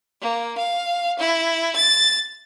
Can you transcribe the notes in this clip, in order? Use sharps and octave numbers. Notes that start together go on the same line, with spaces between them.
A#3
F5
E4
A6